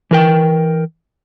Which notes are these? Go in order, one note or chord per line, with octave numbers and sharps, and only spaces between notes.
E3 A#4 G5